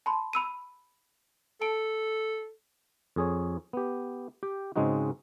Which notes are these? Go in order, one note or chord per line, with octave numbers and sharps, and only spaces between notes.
A5 B5 C6
B5 E6 D#7
A4 A5 D7
F2 G#4 C#5
B3 G4
G4 G5
G#2 C#3 G#3 C4 D#4 F#4